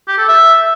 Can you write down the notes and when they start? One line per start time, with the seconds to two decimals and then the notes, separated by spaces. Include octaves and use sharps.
0.08 G4
0.18 A4
0.28 E5